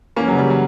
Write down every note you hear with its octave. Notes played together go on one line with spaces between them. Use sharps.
E3 A#3 C#4
C#3 F#3
G3
F#3